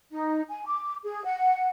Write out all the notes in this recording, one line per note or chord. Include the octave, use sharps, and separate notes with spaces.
D#4
G#5
D6
G#4
F#5